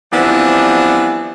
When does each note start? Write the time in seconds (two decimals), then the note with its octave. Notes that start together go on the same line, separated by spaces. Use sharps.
0.12 E3 F3 G3 B3 C4 D4